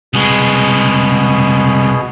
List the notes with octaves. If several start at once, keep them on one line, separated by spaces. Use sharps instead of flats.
C2 B2 G#3 G#4